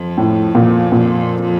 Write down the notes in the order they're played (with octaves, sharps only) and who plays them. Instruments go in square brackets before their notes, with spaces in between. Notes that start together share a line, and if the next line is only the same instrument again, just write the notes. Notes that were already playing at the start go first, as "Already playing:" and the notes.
Already playing: [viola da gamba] F2
[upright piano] A2
A#2
A#2